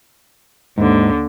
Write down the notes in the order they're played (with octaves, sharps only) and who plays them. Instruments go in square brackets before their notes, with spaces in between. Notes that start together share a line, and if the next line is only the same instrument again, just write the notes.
[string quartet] D#2 D3 [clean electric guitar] G#2